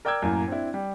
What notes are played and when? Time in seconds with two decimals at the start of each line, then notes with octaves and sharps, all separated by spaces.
0.05 A#4 D5 G5 D6 E6 G#6
0.22 F#2 A2 A#3
0.48 C4 D4 E4
0.74 G3